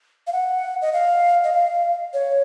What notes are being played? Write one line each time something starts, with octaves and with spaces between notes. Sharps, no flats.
F5
F#5
D#5
F5
D#5
F5
C#5